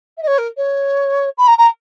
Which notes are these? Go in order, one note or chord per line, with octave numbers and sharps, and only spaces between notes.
E5
D#5
C#5
A#4
C#5
B5
A#5
A#5